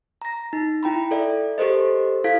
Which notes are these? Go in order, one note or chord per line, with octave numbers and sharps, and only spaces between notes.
A#5 A#6
D#4
E4 G5 A#5 B5
A4 D5 E5
G4 A4 A#4 C5 D#5
E4 A4 F5 G#6 B6